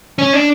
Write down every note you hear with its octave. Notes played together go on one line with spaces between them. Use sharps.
C#4
D4